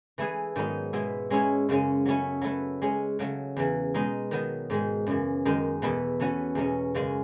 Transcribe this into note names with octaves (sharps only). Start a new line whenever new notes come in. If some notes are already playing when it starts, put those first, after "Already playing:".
E3 A3 E4 G#4 B4
G#2 D#3 F#3 B3 D#4
B2 G#3 B3 E4
G#3 C#4 E4 G#4 C#5
F#2 C#3 G#3 C#4
F#3 A3 C#4 E4
F#3 A3 E4 B4
G#3 C#4 G#4 C#5
C#3 F#3 A3
E2 C#3 E3
B2 G#3 D#4
D#3 F#3 B3
G#2 D#3 G#3
F#2 C#3 E3
F#2 D#3 G#3 D#4
E2 B2 A3 E4 B4
E3 A3 C#4 F#4 B4
E2 B2 A3 C#4
F#2 C#3 G#3 C#4